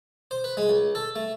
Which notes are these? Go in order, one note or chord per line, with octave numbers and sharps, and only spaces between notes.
C5
B4
G#3
C#2
A4
A3